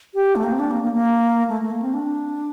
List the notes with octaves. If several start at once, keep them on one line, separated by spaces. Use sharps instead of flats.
G4
A3
A#3
C4
D4
A#3
A#3
A#3
A3
A3
A#3
C4
D4